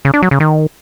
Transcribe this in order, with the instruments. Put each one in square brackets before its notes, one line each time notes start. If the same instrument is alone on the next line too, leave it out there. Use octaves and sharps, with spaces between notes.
[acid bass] C#3
D4
F#3
C#3
D#3